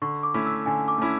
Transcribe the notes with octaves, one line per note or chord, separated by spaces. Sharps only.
D3 C#6
D6
A3 C#4 E4
E6
D3 G#5
D6
A3 C#4 E4